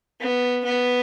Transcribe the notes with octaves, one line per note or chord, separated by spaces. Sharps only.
B3
B3